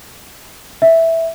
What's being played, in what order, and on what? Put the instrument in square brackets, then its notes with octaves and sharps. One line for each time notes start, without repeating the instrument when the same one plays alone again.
[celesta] E5